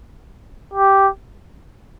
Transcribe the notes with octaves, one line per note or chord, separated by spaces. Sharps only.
G4